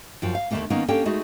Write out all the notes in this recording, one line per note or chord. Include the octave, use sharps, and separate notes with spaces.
F#2 F3 G5
F5
D#2 D3 D#3 A3 A#3 C#4
D#3 A#3 B3 C#4 D#4
A#3 C#4 D4 G4 A4 G5
G#3 A3 D#4 F#4 G#4